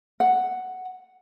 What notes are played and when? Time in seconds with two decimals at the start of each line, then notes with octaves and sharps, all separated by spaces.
0.20 F#5